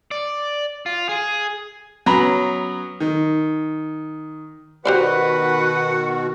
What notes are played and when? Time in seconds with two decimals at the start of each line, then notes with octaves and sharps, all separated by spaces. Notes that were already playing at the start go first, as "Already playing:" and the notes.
0.11 D5
0.86 F4
1.09 G#4
2.06 F#3 B3 C#4 A#5 B5
3.00 D#3
4.85 B2 D#3 F#4 G4 B4 C5 D5 F#5